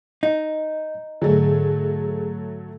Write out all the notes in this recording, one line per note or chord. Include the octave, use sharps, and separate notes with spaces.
D#4 D#5
G#2 D3 F#3 A3 G#4